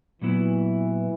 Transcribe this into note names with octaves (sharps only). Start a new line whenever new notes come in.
A#2 E3 F#3 B3 E4